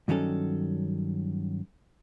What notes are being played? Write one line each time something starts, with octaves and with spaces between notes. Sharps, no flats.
G2 D#3 F#3 C#4 A4